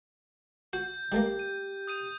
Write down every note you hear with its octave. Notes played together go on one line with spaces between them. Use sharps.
F#4 G6
G3 A3 A#3 G4
D#7
D#6 G6 D#7